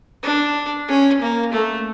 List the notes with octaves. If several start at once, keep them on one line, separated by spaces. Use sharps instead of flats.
D4
C#4
A#3
A3